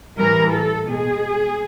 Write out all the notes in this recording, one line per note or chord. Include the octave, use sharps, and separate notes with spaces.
A2 E3 G3 A#4
A4
B2 G#3 G#4